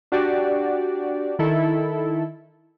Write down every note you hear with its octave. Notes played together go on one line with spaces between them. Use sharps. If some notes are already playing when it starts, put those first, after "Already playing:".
D4 F#4 G4 D5
D#3 E4 A4